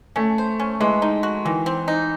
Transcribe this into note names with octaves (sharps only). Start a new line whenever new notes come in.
A3 C#4
C5
C#4
E3 G#3
D#4
F#4
D#3 E3
C4
D#4